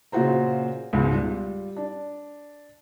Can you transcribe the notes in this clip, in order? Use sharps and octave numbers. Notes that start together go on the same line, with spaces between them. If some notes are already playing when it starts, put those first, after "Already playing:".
A#2 C#3 F4 F#4 C5 A#5
C#2 G#2 B2
G3 F4
D4